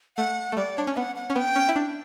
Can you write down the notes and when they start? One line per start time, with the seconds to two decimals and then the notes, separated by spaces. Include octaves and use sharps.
0.17 A3 F#5
0.52 A3
0.56 G3 D5
0.77 D4 C#5
0.87 C#4
0.96 B3 F#5
1.16 F#5
1.30 C#4
1.35 B3 G5
1.56 C#4
1.69 E4
1.76 D4